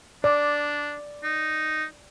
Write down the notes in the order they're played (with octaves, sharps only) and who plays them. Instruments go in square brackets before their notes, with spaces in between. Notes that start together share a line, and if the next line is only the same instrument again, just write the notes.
[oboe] D4 [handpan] D5
[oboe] D#4